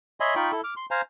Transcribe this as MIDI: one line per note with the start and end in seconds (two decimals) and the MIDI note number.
0.20 0.35 73
0.20 0.35 75
0.20 0.35 76
0.20 0.35 80
0.20 0.35 83
0.20 0.35 84
0.36 0.51 63
0.36 0.51 65
0.36 0.51 79
0.36 0.51 83
0.36 0.51 85
0.52 0.61 64
0.52 0.61 69
0.64 0.74 86
0.64 0.74 89
0.77 0.86 84
0.91 1.02 72
0.91 1.02 77
0.91 1.02 80
0.91 1.02 82